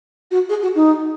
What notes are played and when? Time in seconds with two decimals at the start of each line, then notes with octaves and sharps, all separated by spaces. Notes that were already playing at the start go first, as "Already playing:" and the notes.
0.31 F#4
0.49 G#4
0.62 F#4
0.75 D#4